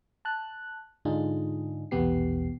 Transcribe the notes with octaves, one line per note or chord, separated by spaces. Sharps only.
A5 F#6
G#2 D3 D4 D#4 F4 G#4
A#1 E2 B2 B3 G4 C7